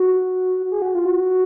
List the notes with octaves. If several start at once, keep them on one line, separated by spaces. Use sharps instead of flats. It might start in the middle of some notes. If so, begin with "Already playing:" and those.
Already playing: F#4
G#4
F#4
F4
F#4